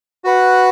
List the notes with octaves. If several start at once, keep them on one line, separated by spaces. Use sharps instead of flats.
F#4 B4 F#5